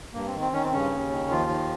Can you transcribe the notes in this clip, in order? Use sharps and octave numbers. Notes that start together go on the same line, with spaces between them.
G2 A#3
C4
D#3
C4
D#3 C#4
C4
G2 C#3 C#4
D#2
D#3
D#2 F3 F4
D#3